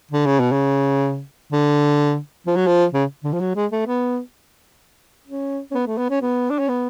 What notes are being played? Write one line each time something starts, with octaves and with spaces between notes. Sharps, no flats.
D3
C#3
B2
C#3
D3
F3
F#3
F3
C#3
D3
F3
F#3
G#3
A3
B3
C#4
C#4
B3
A3
B3
C#4
B3
D4
C#4
B3